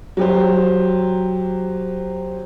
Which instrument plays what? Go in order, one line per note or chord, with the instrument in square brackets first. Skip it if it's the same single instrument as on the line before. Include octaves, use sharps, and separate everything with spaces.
[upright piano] F#3 G4 C5